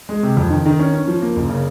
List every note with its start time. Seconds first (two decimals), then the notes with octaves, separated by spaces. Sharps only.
0.09 G#3
0.23 C3
0.37 F2
0.50 D#3
0.66 D#3
0.79 C#4
0.94 C#4
1.07 F3
1.22 A#3
1.36 F#1
1.49 C#3